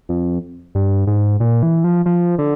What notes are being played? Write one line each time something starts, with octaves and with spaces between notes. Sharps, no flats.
F2
G2
G#2
A#2
E3
F3
F3
D3